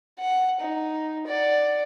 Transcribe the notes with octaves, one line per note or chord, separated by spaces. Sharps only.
F#5
D#4
D5 F#5